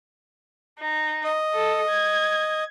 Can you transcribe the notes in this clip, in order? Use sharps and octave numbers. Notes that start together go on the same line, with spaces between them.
D#4
D#5
A4
G#6